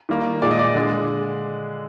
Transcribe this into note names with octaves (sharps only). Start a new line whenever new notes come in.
D#3 G3 A#3
A#2 G#3 D5
D#5
D5
D3 G#3